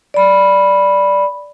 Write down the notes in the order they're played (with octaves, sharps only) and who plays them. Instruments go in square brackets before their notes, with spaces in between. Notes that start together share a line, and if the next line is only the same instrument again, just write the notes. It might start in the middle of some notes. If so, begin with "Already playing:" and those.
[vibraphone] D5 B5